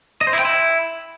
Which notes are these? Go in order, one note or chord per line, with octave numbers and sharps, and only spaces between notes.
D#5
C5
E4
G5
E4